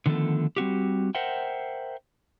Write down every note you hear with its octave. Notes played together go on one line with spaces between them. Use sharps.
D3 D#3 F3 A3 B3 A4
G3 C4 F#4 G4
A#4 C5 E5 F#5 G5